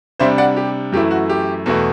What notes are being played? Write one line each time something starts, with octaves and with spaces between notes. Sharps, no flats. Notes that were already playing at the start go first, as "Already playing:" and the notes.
C3 G3 D4 C5 E5
D5 F#5
G4
F#2 E3 A3 E4 G4
F#4
G4
E2 B2 A3 E4